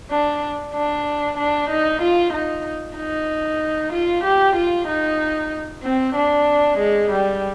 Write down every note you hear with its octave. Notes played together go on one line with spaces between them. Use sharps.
D4
D4
D4
D#4
F4
D#4
D#4
F4
G4
F4
D#4
C4
D4
G#3
G3